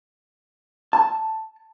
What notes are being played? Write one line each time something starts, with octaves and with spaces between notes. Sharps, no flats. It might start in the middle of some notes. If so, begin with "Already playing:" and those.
A5